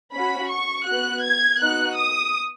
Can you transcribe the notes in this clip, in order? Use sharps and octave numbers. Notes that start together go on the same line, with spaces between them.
C#4 F#4 B5
C#6
B3 F#4 F#6
G#6
B3 D#4 F#4 F#6
D#6